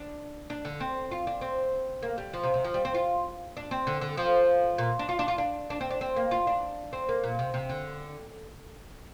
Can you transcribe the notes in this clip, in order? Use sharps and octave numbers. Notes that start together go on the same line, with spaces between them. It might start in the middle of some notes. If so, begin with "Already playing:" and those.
Already playing: D4
D4
D3
C4
F4
D4
C4
A#3
G3
F3
C3
C3
F3
G3
C4
F4
D4
C4
D3
D3
F3
A#2
D4
F4
D4
F4
D4
D4
C4
D4
C4
A#3
F4
D4
C4
A#3
A#2
C3
C3
D3